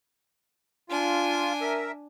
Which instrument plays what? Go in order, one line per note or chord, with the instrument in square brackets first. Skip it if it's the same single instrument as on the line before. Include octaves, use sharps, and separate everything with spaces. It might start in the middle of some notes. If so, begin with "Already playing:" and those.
[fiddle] D4 G#5 [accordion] F4
[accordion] A#4 E5